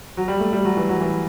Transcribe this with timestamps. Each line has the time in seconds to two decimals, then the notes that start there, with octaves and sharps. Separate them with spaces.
0.17 F#3
0.28 G3
0.40 A3
0.53 G3
0.65 F#3
0.77 E3
0.89 F#3
1.01 E3